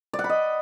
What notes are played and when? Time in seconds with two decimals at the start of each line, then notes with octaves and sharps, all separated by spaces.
0.13 D5
0.19 F#5
0.24 B5
0.29 D#5